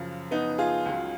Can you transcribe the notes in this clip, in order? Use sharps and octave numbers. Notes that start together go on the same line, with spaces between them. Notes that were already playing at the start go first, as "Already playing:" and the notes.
Already playing: F#2 C#3 F3
B3 D#4
F4 G#4
C#2 C#3 F#3